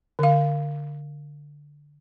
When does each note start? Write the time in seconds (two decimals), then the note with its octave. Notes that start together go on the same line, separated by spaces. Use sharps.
0.19 D3 F5